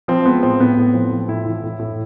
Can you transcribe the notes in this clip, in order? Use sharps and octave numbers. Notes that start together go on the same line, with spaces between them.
F3 C4
G#3 B3
A2 C4
A2 B3
A2
F3 C4
F3
A2 E4
E3
A2
A2